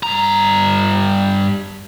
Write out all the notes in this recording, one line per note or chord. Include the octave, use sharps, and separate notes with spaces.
G2 A#5